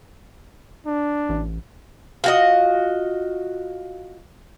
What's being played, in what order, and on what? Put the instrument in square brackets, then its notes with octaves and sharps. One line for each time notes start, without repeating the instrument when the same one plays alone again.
[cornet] D4
[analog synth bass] A1
[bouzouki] F4 F#4 D#5